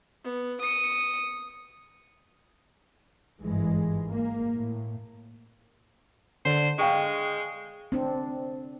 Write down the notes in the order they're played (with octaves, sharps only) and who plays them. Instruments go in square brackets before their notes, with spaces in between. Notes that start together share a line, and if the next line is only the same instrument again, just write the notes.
[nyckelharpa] B3
[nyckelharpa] D#6 [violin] C#7 D#7
[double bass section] G#1 G2 E3 G#3
A#3
A2
[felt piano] D3 [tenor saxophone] C5
[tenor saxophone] G#3 [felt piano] F5 G5 C#6
[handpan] C4 D4